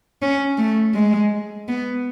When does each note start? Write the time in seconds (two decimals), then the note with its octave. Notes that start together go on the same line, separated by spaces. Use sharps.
0.22 C#4
0.58 A3
0.94 G#3
1.68 B3